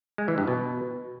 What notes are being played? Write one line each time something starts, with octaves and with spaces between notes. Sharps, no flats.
G#3
E3
G2
B2